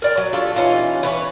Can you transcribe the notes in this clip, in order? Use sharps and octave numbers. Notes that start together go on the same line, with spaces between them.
A#4 D5 G5
F#3
D4 F4 G4 A4
E3 C#4 D#4 F4
E3 B4 C#5